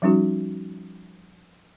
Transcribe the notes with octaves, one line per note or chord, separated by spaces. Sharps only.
F3 G3 C#4 D#4 F#4